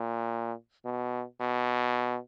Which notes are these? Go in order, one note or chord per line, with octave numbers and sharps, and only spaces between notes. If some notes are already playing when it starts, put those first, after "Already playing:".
Already playing: A#2
B2
B2